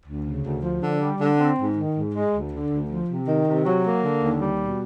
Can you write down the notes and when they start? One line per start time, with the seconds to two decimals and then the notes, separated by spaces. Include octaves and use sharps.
0.06 D2
0.26 C#3
0.44 D2
0.63 F3
0.82 D3
1.01 G3
1.20 D3
1.38 C4
1.58 G#2
1.77 D#3
1.95 G#2
2.14 G#3
2.33 D2
2.52 D3
2.71 D2
2.90 F3
3.09 C3
3.28 D#3
3.46 C3
3.66 F#3
3.85 A#3
4.03 D3
4.23 D#2
4.41 G3
4.60 B2